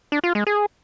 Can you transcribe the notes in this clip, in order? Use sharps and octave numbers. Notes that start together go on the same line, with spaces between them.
D4
F4
G#3
G#4